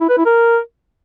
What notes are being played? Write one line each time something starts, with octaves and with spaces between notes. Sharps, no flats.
E4
B4
E4
A#4